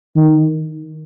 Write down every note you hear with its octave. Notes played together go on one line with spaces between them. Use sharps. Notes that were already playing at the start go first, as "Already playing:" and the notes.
D#3